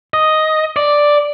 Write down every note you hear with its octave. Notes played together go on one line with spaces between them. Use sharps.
D#5
D5